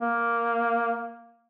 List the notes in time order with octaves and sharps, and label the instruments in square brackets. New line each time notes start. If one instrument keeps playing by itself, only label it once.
[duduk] A#3